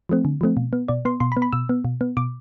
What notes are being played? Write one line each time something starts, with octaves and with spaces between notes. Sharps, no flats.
F3 A3 C4
D3
F3 A3 C4
B2
B3
B2 D5
B3 C6
B2 C6
B5
B3
B5
B2 E6
B3
B2
B3
B2 D6